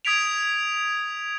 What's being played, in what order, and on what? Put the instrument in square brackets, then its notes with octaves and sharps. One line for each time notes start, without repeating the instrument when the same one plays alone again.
[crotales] D#6 G#6 B6 D7 F7